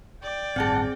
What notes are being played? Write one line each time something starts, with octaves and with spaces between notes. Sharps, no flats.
D5 G5
A1 G2 C4 G#4 F#5 G#5 A5